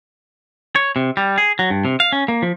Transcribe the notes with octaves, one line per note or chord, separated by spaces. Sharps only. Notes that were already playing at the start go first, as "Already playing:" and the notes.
C#5
C3
G3
G#4
F#3
G2
C3
F5
C#4
A#3
F3